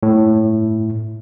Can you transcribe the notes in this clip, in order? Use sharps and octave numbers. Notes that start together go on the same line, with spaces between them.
A2